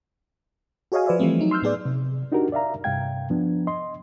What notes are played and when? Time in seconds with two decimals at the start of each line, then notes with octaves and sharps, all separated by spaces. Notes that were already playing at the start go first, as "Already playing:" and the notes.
0.92 F#4 G#4 C#5 D#5 F5 G#5
1.06 F3 B4 C5 D5 E5
1.20 E3 F3 G3 A3 C4
1.39 F#3 D#4
1.51 C6 E6 F6 G6
1.62 A2 B3 G#4 D5
1.85 C3
2.32 D4 D#4 F#4 G4 A#4
2.52 D5 E5 F5 A#5
2.84 G2 C3 F5 G5 G#6
3.30 F3 B3 D4
3.67 D#5 C6